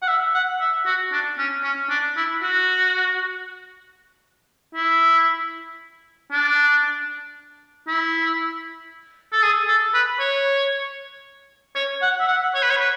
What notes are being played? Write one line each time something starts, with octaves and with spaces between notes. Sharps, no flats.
F#5
E5
F#5
E5
F#4
D4
C#4
C#4
D4
E4
F#4
E4
D4
E4
A4
G#4
A4
B4
C#5
C#5
F#5
E5
F#5
C#5
B4
C#5
B4